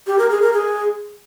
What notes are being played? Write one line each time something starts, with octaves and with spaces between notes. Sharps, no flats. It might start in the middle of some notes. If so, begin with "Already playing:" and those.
G4
A#4
G#4
A#4
G#4